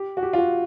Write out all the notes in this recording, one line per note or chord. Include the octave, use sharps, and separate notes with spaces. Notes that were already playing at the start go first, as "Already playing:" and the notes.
Already playing: G4
F#4
G4
F4
F#4